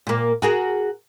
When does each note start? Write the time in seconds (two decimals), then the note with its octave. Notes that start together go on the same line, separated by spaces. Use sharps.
0.07 A#2 A#3
0.42 F#4 G#4 A#4